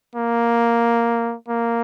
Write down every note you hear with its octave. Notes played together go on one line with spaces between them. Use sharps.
A#3
A#3